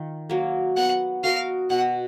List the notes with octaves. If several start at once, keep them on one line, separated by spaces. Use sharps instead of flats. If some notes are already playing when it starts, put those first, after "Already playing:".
Already playing: D#3 F4
F#3 A#3
B3 F#5
F#4 A#4 D#5 F5
B2 F#5